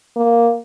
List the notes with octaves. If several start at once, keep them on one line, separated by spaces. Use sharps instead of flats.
A#3